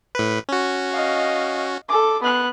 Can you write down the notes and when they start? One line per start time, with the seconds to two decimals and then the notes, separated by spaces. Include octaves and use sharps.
0.15 A2 B4
0.49 C#4 F#4
0.91 D#5 F5
1.89 A4 D6
2.22 B3 F#6